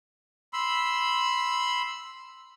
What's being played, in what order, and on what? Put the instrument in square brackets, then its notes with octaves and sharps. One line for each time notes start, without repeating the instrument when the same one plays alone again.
[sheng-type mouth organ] B5 C6 E6